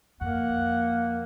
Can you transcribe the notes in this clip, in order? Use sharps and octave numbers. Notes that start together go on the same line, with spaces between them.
F2 A#3 F#5